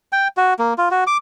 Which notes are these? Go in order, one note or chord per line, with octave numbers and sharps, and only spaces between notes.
G5
F#4
A#3
F4
F#4
D6